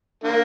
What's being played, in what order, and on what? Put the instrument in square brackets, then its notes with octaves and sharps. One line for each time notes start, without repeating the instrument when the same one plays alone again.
[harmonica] D3 A#3